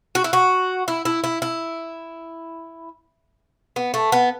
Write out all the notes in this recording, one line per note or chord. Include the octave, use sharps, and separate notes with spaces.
F#4
E4
F#4
E4
E4
E4
E4
B3
A3
B3